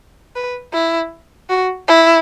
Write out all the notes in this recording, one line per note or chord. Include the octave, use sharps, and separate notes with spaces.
B4
E4
F#4
E4